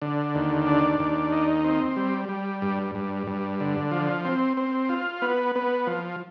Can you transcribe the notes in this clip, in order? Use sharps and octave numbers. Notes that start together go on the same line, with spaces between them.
D3
D#2
D4
D#2
D#4
C4
G3
G3
G2
G2
G2
D3
F3
C4
C4
F4
B3
B3
F3